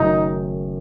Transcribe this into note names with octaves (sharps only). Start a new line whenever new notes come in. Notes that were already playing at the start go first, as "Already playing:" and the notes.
Already playing: F#1 F#2 D#3 F#3 A3 D#4